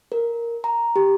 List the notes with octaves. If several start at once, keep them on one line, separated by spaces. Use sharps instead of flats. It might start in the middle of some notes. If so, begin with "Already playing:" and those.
A#4
A#5
G4